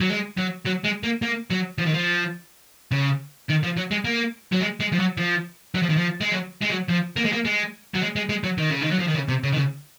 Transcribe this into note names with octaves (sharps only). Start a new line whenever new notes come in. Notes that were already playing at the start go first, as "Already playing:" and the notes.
F#3
G#3
F#3
F#3
G#3
A#3
A#3
F#3
F3
D#3
F3
C#3
D#3
F3
F#3
G#3
A#3
F#3
G#3
G#3
F3
F#3
F3
F#3
F3
D#3
F3
G#3
F#3
G#3
F#3
F3
A#3
G#3
A#3
G#3
F#3
G#3
G#3
G#3
F#3
D#3
C#3
D#3
F#3
F3
D#3
C#3
C3
C#3
D#3
C#3